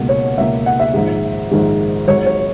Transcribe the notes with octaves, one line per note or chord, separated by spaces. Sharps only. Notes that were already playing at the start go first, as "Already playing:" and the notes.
Already playing: C#2 B2 A#3
C#5
C#2 B2 A#3 E5
F#5
E5
A#1 G#2 D#3 G#3
A#1 G#2 D#3 G#3
G#1 G#2 F#3 C#5
C#5